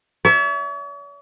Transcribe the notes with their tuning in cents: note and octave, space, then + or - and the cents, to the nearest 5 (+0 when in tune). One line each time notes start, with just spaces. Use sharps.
C#5 +45 E5 +0